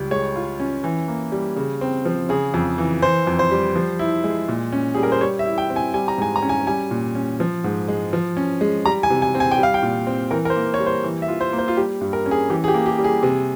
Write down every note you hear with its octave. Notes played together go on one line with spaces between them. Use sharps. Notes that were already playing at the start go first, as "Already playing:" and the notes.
Already playing: C#2 G3
G#3 C#5
F4
C#4
E3
A#3
G3
C#3
C4
F3
C#3 G#4
F2
E3
E3 C5
F2
C5
G3
F3
E4
G#3
A#2
C#4
G3 G#4
A#4
C5
G3 C#5
E5
E4
G5
C4
G#5
G3 G#5
A#5
G#2 G#5
A#5
C#4
G#5
G3 G#5
A#2
C#4
F3
G#2
G#3
F3
C#4
G#3
G3 A#5
G#5
C3
G#5
C4
G#5
G5
G3
F5
G5
A#2
C4
E3 A#4
A#4
C5
A#3
C#5
G3
C5
E3
E5
F4
C5
A#3
C5
F4
G3 G4
G2
A#4
C#4
G#4
E3 G4
G#4
G4
A#3
G4
G3
G#4
C3